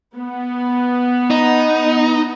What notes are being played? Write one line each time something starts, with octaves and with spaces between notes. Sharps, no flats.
B3
D#4